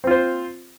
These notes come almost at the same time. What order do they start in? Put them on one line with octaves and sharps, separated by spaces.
C4 F4 C5